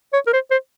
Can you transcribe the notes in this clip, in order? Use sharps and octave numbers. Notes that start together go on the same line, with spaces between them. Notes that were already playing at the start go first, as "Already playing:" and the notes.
C#5
A#4
C5
C5